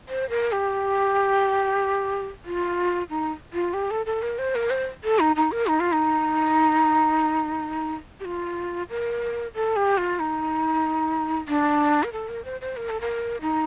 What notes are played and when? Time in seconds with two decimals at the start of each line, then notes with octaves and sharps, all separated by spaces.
0.09 C5
0.30 A#4
0.52 G4
2.45 F4
3.09 D#4
3.53 F4
3.74 G4
3.91 A4
4.06 A4
4.22 A#4
4.39 C5
4.55 A#4
4.70 C5
5.04 A4
5.19 D#4
5.36 D#4
5.52 A#4
5.67 D#4
5.80 F4
5.92 D#4
8.20 G4
8.25 F4
8.90 A#4
9.55 A4
9.76 G4
9.98 F4
10.20 D#4
11.48 D4
12.04 A#4
12.13 A4
12.29 A#4
12.45 C5
12.61 C5
12.77 A#4
12.90 A4
13.01 A#4
13.41 D#4